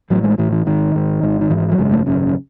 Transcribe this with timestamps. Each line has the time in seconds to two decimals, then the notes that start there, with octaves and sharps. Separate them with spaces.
0.10 A1 A2 F#3
0.24 G#3
0.38 A1 A2 E3
0.52 E3
0.66 G#1 G#2 D#3
0.95 G#1 G#2
1.23 G#1 G#2
1.41 D#3
1.50 G#1 G#2 E3
1.71 F#3
1.78 G#1 F#2 C#3 G#3
1.92 A3
2.06 G#1 F#2 C#3